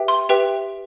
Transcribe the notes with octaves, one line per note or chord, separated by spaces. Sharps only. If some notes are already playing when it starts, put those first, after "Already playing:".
Already playing: G4 B4 E5 G5
C6
G4 B4 E5 G5